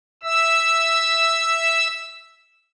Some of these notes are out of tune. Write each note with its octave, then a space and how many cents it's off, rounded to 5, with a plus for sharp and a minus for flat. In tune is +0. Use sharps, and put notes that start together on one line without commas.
E5 +0 E6 +0